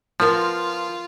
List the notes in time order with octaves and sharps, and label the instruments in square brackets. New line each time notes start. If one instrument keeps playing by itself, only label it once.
[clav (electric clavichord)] F3 [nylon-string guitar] B3 A#4 [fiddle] F4